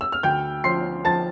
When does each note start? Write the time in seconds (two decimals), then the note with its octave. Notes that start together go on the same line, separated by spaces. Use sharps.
0.01 E6
0.12 F6
0.23 D2 G5 G6
0.64 F3 C6 C7
1.05 F3 A5 A6